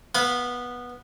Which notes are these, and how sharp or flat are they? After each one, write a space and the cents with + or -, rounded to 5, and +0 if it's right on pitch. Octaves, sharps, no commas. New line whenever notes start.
B3 -10 F5 +20 B5 +0